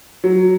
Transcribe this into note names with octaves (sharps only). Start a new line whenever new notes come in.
F#3